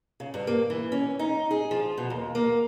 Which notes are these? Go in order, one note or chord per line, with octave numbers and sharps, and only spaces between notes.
C#3
G2
A#3
E3
C#4
D#4
G#4
F3
B2
D#2
A#3